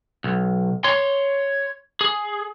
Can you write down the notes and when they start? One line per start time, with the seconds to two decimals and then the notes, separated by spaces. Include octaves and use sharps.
0.24 B1
0.84 C#5 C6
2.01 G#4